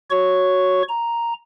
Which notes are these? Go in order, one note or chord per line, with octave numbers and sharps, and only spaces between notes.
F#4 C#5 C#6
A#5